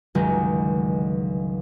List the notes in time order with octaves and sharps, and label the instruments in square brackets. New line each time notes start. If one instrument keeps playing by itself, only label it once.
[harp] G1 C#2 D#3 F#3 G#3 G6